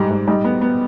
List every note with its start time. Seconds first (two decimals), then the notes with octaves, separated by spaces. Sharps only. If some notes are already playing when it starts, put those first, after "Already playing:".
Already playing: G#2 G3 G4
0.10 G#2
0.27 G3 D#4
0.44 B3
0.61 B3